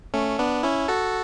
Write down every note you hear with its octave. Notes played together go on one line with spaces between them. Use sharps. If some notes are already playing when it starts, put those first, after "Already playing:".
A3 C#4
B3 D4
C#4 E4
F#4 A4